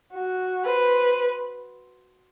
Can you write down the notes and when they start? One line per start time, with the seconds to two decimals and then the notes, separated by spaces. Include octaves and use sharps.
0.14 F#4
0.65 B4 C5